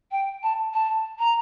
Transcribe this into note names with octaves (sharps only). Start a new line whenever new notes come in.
G5
A5
A5
A#5